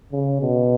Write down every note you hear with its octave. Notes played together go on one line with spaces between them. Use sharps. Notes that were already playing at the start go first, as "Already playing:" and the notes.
C#3
B2